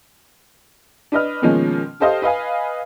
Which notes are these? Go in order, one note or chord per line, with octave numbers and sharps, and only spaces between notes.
D4 B4 D#5 F6
B2 D#3 F3 G#3 A#3 C#4
G4 A4 C5 D#5 F5
B4 D#5 F5 G#5